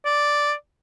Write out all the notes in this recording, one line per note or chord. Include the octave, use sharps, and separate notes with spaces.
D5